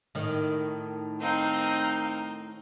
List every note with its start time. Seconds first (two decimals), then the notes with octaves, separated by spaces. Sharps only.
0.15 A2 D#3
1.21 C4 D#4 A#4 F5